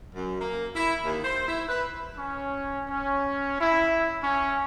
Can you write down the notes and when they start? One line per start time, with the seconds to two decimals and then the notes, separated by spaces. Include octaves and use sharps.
0.15 F#2
0.41 A#3
0.76 E4
1.05 D#2
1.24 C5
1.48 E4
1.69 B4
2.18 C#4
2.90 C#4
3.61 E4
4.23 C#4